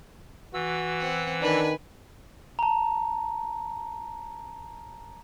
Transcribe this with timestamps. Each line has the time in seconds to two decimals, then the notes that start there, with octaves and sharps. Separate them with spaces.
0.54 E3 F#4 E6
1.00 C4 F#5
1.42 D#3 D4 B4 G#5
2.59 A5 A#5